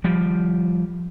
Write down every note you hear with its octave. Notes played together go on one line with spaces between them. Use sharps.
F3 G3